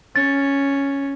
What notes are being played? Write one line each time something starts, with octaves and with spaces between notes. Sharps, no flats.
C#4 A6